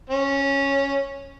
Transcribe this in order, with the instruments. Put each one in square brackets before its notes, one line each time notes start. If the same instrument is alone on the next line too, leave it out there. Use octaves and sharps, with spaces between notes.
[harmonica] C#4